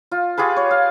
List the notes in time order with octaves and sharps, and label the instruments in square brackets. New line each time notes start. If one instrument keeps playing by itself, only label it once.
[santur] F4
F4 G4 G#4 B4
C#5
F5